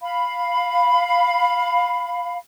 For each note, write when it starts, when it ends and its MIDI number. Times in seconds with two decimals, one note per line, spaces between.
0.01 2.37 77
0.01 2.37 83